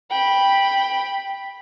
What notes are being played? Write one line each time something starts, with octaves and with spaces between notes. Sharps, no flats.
G5 B5